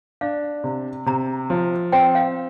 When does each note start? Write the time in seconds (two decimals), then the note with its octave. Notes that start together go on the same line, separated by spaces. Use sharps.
0.21 D4 F5
0.64 C3
1.06 C3 A#5
1.50 F3
1.92 C4 G5
2.15 F5